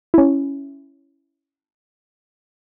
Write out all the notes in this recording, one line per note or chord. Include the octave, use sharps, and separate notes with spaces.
C#4 E4